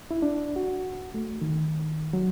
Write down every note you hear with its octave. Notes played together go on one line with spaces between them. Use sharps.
E4
D4
F#4
A3
D#3
F#3